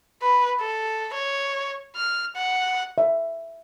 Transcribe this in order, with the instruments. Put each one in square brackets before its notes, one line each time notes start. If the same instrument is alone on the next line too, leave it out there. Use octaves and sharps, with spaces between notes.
[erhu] B4
A4
C#5
F6
F#5
[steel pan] E5